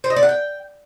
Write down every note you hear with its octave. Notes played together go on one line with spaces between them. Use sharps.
C5
D#5
D5
F#5
G5